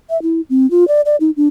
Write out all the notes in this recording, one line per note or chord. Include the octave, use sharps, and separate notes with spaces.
E5
E4
C4
F4
D5
D5
D#4
D4